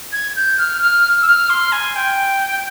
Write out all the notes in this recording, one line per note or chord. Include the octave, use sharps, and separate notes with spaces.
G#6
G6
F6
F6
E6
F6
C6
G#5
G5